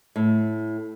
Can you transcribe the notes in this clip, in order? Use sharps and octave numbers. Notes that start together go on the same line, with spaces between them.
A2